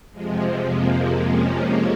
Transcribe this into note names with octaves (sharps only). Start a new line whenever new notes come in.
F2 C3 F3 G#3
A#3
C#4
A#3